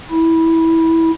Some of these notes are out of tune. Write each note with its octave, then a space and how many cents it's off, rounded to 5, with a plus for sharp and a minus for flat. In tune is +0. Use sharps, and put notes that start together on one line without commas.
E4 -15